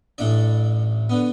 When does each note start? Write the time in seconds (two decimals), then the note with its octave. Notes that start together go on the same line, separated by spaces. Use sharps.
0.18 A1 A2 A3 D4 D5
1.09 D3 B3